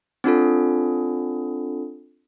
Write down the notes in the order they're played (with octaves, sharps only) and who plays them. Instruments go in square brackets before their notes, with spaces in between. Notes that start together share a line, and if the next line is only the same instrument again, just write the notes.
[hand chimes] C4 D4 F4 A4